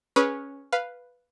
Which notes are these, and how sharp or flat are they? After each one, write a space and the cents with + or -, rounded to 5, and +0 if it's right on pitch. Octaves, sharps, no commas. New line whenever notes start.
C#4 +0 G#4 +0 B4 -20
B4 +0 F5 +0